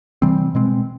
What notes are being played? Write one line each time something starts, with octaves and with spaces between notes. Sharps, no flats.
C3 E3 G3 C4
B2 G#3 C4